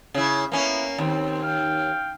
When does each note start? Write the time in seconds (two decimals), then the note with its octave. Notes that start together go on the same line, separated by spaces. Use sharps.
0.14 C#3 E4
0.52 A#3 B3 C#4 E4
0.98 D#2 C4
1.42 F5 G5